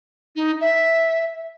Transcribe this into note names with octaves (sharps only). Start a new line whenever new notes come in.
D#4
E5